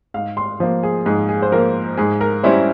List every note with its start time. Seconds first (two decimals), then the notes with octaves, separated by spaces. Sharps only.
0.14 G#2 F5
0.37 C6
0.60 F3 A#3
0.83 G#4
1.06 G#2 G#4
1.29 G#4
1.42 C5
1.52 F3 A#3 A#4
1.97 G#2 G#4
2.21 A#4
2.43 G3 C#4 E4 C5